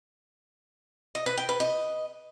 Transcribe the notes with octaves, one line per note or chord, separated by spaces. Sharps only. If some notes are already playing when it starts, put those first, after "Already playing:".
D#5
B4
G5
B4
D#5